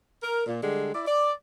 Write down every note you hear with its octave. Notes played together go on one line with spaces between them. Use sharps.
A#4
A#2
D3 G3 G#3
E4 D5
D5